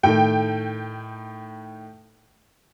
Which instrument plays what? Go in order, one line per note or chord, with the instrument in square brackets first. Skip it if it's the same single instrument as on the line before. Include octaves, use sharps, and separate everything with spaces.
[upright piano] A2 D#3 A3 [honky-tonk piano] G5